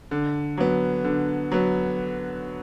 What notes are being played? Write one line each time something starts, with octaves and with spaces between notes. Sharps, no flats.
D3
F#3 B3
D3
F#3 B3